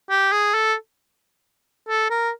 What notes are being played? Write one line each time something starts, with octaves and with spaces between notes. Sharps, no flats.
G4
G#4
A4
A4
A#4